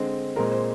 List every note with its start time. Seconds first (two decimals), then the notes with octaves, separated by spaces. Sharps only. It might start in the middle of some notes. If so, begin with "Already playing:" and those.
Already playing: D3 G#3 C4
0.36 A#2 G#3 C4 A#4
0.52 C5